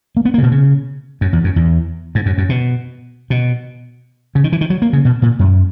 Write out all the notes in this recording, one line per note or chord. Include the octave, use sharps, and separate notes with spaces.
A#3
B3
A#3
C#3
B2
C#3
F#2
E2
F#2
E2
G#2
F#2
F#2
B2
B2
C#3
D#3
E3
D#3
F#3
A#3
C#3
B2
A#2
F#2